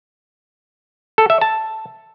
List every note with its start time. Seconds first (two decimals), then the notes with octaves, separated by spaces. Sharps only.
1.18 A4
1.30 E5
1.41 A5